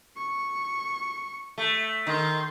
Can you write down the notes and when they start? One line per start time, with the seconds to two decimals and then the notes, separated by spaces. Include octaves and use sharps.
0.17 C#6
1.58 A3
2.07 D#3 C6